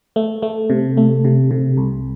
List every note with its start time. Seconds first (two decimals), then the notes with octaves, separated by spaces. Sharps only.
0.16 A3
0.42 A3
0.70 C3
0.97 A3
1.25 C3
1.51 C3
1.77 C2